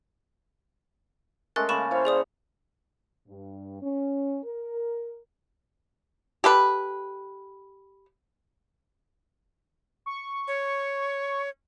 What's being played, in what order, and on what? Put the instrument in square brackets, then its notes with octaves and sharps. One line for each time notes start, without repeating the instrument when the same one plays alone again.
[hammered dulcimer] G#3 A3 C#4 [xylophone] A#4 F#6 A6
[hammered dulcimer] C#3 A#3 A5 [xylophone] B5 C#6 E7
[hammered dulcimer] E4 C#5 F5 [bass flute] C5
[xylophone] G#4 D5 D#6
[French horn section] G2
C#4
A#4
[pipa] G4 A4 B4
[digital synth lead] C#6
[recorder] C#5